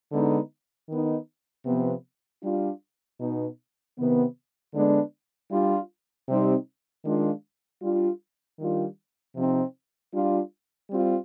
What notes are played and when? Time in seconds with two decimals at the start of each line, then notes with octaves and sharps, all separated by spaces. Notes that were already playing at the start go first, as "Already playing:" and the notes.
0.12 D3 G#3 B3 D#4
0.89 D#3 B3 D#4
1.66 C3 F3 B3
2.43 G3 D4 F4
3.20 B2 B3 D#4
3.98 C3 D#3 B3
4.74 D3 G#3 B3 D4
5.51 G3 D4 F4
6.28 C3 G3 C4 D#4
7.04 D#3 G#3 D4 F4
7.82 G3 D4 F4
8.59 D#3 G3 D4 F4
9.36 C3 F3 C4 D#4
10.13 G3 D4 F4
10.90 G3 C4 F4